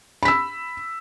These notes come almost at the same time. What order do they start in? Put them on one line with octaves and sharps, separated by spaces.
B5 B6 E6